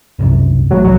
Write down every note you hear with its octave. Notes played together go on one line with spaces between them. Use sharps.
E1 C2 F#2
A1 E3 F#3 A3
C2 E3 F#3